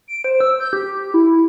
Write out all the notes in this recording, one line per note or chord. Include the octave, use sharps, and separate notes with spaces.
D7
C5
E6
G6
G4
E4